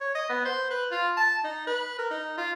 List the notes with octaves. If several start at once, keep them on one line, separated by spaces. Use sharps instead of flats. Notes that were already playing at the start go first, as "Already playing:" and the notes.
C#5
D#5
B3
C5
B4
F4
A5
D#4
B4
A#4
D#4
F4